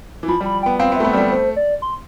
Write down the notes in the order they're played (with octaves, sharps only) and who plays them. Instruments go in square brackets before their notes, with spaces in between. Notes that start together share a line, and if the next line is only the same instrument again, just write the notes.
[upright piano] E3
[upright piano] F3 [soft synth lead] B5
[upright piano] G3
[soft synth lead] B5
[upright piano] B3 [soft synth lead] G5
[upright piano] C4 [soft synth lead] F5
[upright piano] B3
[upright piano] A3 [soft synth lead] E5
[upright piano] B3
[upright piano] G3 [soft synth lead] D5
[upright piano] A3
[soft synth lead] C5
D5
C6